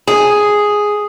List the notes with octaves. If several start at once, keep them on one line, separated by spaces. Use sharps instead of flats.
G#4